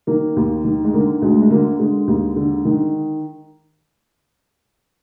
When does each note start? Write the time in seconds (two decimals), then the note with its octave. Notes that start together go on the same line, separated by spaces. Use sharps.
0.07 D#3 A#3
0.36 D#2
0.65 D#3
0.84 G#3
0.93 D3 A#3
1.22 D2 G#3
1.42 G#3
1.50 D3 A#3
1.79 D3 G#3
2.08 D#2
2.36 D3
2.65 D#3